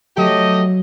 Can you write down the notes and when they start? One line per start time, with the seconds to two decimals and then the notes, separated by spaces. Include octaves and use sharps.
0.17 F#3 A3 G4 D#5